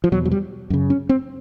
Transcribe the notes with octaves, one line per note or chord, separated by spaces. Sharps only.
F3
E2 B2 F#3
F#3
G3
F#2 C#3
C#4
C4